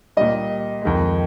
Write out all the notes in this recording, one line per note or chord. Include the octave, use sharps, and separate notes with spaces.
A#2 G3 D#5
F2 D#3 G#3